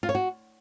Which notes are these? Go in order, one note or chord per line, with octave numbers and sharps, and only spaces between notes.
F4
C#5
F#4